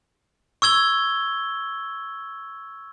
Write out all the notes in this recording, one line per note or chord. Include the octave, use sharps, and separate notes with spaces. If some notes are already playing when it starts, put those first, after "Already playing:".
C#6 E6 G#6 G7